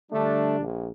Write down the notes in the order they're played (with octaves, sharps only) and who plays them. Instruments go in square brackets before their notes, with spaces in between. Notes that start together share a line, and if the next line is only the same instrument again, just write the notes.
[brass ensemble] D3 G3 D4 [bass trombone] A3
[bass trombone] A#1